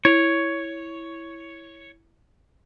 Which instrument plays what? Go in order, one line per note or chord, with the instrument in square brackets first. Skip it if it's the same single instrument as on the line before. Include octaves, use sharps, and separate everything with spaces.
[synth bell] E4 F7 [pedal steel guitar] C#5